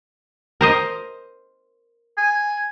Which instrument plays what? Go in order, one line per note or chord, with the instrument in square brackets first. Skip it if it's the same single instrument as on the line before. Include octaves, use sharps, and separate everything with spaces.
[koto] A#4 C5 D#5
[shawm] G#5